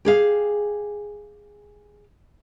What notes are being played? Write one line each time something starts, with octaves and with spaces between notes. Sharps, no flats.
G4 G#4 F5